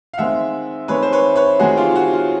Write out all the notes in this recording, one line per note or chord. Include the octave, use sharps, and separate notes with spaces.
F5
D#3 G#3 C4 E5 F#5
D#3 G#3 C4 B4 C#5
C5
B4 C#5
B4 C#5
D#3 G#3 C4 F#4 G#4
F4 G4
F#4
F4